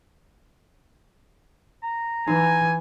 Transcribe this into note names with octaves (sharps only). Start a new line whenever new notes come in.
A#5
E3 D#4 G#5